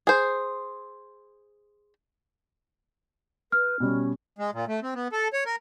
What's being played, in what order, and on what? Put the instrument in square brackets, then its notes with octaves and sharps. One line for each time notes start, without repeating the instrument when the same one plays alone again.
[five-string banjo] G#4 C5
[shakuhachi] B4 [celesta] F6
[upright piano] B2 G3 [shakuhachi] C#4
[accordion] G#3
A#2
A3
C4
B3
A4
C#5
A#4